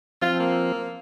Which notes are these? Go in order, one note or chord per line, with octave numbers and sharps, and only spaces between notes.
F3 C4 F4
A#3